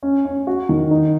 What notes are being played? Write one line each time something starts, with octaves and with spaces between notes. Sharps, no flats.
C#4
C#4
F#4
D#3
D#4